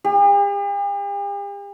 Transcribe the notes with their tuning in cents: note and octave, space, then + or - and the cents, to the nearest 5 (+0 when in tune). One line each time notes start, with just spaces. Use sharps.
G4 +45